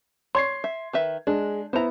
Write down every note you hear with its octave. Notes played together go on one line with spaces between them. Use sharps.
C#5 C6 G#6 C7
E5
D#3 B4 E5
G#3 D4
B3 E4 C5 A#5